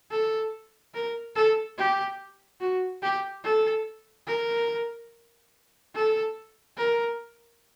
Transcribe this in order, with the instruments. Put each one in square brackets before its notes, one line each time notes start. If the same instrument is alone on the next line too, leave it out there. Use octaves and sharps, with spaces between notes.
[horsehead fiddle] A4
A#4
A4
G4
F#4
G4
A4
A#4
A4
A#4